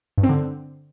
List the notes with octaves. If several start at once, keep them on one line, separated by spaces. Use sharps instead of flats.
G2
C4
D3